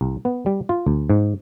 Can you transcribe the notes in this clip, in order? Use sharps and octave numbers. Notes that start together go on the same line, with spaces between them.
C2
B3
G3
F4
D2
G#2